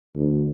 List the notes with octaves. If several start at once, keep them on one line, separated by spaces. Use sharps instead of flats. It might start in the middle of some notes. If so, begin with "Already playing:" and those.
D2